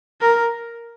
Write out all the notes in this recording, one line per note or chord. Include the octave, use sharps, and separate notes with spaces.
A#4